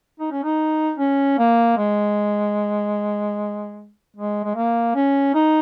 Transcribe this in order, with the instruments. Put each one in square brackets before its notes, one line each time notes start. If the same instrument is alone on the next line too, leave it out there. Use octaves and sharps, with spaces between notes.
[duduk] D#4
C#4
D#4
C#4
A#3
G#3
G#3
G#3
A#3
C#4
D#4